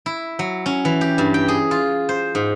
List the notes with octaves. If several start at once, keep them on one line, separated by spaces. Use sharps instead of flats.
E4
F#3
C#4
E3
G4
G2
G5
G#4
F4
C5
G#2